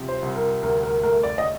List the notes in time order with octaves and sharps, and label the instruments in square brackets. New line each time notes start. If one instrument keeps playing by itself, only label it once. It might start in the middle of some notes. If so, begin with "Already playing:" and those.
Already playing: [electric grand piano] C2 C3 F3
[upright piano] C5
[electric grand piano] C2
[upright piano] A#4
[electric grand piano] D2 [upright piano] A#4
[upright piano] A#4
[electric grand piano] A3 [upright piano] A#4
[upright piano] D5
D#5